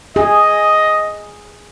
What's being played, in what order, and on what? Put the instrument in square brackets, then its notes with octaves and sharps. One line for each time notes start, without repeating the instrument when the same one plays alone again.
[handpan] G#4 [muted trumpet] D#5